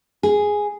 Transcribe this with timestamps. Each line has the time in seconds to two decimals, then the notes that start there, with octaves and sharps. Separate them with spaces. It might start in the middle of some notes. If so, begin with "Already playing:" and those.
0.23 G#4